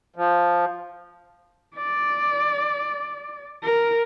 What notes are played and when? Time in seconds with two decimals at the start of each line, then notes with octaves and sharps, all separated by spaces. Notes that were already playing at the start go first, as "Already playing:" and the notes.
0.16 F3
1.75 D5
3.63 A#4